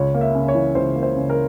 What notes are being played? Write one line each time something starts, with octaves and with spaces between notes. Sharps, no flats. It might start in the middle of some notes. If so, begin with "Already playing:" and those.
Already playing: C#2 C#5
A#3
E5
C#3
C#5
E3
C#2 C5
A#3
C5
C#3
A#4